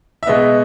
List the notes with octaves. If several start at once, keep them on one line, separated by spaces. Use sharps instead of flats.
E5
B2 G#3 B3 D#5